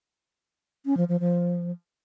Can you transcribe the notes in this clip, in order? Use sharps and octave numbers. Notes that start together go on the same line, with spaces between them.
C#4
F3
F3
F3